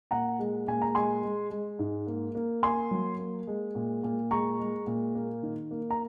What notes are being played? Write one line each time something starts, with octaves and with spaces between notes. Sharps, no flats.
A#2 F#5 A#5
G#3
A#2 G#5
A#5
G#3 G#5 C6
G#3
G#3
G#2
A#3
A#3
A#3 G#5 C6
F#3
A#3
G#3
A#2
A#2
G#3 A#5 C#6
G#3
A#2
A#3
D#3
A#3
A#5